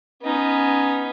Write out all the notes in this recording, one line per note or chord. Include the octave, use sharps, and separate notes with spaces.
B3 C#4 D#4